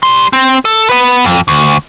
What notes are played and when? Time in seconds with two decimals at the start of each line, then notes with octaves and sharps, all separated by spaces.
0.03 G3 C6
0.33 C4
0.65 A4
0.89 B3 B4
1.24 F2
1.48 D2